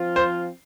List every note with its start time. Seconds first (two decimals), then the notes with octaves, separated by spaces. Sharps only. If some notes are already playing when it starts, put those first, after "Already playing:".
Already playing: F3 C4 F4
0.16 C5